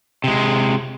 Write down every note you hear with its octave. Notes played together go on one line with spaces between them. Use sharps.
C3 G#3